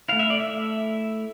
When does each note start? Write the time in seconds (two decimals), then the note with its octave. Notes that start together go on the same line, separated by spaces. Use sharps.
0.09 A3 E4 F5
0.19 E5
0.30 D5
0.40 E5